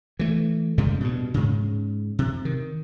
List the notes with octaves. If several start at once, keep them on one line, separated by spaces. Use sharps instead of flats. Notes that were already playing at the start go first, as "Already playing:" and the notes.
E3 A3
A2 C#3 G3 G#3
G2 B2
G#2 C#3
C3
D#3